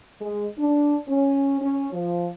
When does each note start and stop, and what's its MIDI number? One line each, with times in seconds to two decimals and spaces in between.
0.21 0.47 56
0.58 0.96 62
1.08 1.57 61
1.61 1.89 61
1.93 2.28 53